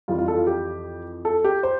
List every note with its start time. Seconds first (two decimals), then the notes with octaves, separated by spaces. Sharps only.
0.08 F2 E3 G3 F4
0.18 F4
0.28 A4
0.37 F4
0.47 G4
1.25 A4
1.44 G4
1.63 C5